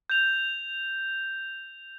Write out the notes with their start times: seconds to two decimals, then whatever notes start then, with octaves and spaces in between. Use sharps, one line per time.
0.10 G6 F7